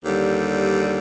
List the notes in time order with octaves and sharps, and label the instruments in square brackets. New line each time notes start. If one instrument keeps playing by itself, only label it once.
[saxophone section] D#2 D3 G3